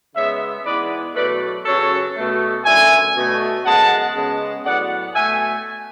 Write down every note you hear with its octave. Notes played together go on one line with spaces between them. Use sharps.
C#3 G#3 B3 C#5 E5
G#2 E3 G#3 B3 B4 D5
B2 F#3 A3 B4 D5
F#2 C#3 F#3 A4 C#5
B2 A3
F#2 D3 A3 E5 G#5
B2 A3
F#2 C#3 G#3 B3 F#5 A5
C#3 G#3 B3
A2 F#3 B3 D5 F#5
B2 A3 E5 G#5